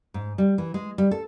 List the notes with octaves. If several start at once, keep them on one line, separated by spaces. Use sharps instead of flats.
G#2
G3
E3
G#3
G3
A4